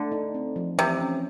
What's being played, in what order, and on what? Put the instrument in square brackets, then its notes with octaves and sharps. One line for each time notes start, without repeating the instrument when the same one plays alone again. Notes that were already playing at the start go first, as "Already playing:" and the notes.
Already playing: [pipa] D3 [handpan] A3
[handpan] D#4
C4
F3
[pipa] C3 [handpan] E3
[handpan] C#4